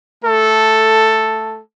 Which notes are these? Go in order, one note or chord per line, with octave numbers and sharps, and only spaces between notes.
A3 A4